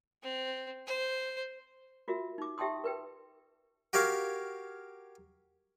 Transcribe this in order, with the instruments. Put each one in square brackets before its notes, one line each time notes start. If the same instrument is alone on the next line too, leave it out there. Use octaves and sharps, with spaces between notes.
[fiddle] C4
C5
[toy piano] F4 F#4 A#4 E5
D#4 D6
G4 E5 G5 A5 C6 D#6
A#4 B4 G5
[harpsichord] F#4 G4 A#4 C#5 F5